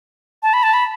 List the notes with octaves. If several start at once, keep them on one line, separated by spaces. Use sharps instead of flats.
A5
B5
A5
B5